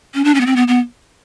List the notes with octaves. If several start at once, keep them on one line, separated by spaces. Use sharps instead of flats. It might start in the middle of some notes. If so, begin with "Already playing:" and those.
C#4
D4
C#4
B3
C4
B3
B3